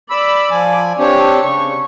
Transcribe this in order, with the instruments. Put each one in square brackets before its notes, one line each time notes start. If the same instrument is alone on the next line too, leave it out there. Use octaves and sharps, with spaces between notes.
[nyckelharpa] D5 [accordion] B5 E6
[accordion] F3 G#5
[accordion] C4 D4 G4 [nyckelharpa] C#5
[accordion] C#3 [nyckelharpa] C#6